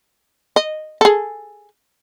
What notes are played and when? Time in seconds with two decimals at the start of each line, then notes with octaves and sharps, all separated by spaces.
0.56 D#5
1.01 G#4 A4